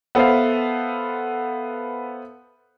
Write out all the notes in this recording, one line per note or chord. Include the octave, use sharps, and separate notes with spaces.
B3 A4 B4 C5 E5 F5